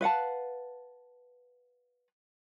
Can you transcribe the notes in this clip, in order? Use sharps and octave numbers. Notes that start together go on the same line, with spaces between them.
B4 F5 F#5 A5